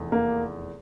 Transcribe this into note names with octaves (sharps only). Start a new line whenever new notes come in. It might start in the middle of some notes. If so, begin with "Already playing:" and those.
Already playing: F1 E2
A#3